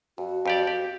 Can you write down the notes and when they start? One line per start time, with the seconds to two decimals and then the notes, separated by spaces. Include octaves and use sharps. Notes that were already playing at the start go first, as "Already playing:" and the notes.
0.18 F2 F#4
0.46 F2 G4 D5
0.67 G4